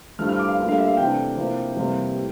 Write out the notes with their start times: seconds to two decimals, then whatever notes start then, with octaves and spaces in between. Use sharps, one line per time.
0.19 G2 F3 A3 E4 F6
0.29 F6
0.39 D6
0.49 F5
0.58 D2 D3 G3 A#3 F4
0.69 F5
0.78 E5
0.88 F5
0.97 C3 E3 A3 D4 G5
1.37 C3 F3 A#3 E4
1.76 F2 C3 E3 G3 A#3
2.16 A2